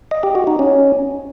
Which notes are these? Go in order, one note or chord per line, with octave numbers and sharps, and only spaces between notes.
D#5
G4
F#4
D#4
C#4